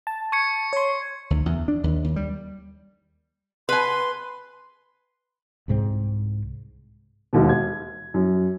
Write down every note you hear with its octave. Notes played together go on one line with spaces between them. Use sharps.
A5
C#6 G#6 C#7
C#5 C6
D2
E2
D4
D#2
D#2
G3
B4 G#5 C6
C2 G#2 E3 C4
E1 D#2 B2
G#6
F#2